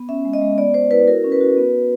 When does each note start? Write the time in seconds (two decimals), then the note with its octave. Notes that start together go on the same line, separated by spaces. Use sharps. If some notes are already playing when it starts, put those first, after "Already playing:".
Already playing: B3
0.08 C#4 E5
0.25 G#3
0.33 D#5
0.41 G#3
0.58 B3 D5
0.74 B3 C5
0.91 E4 B4
1.07 F#4 A#4
1.24 C#4
1.32 B4
1.41 F#4
1.57 B3
1.73 B3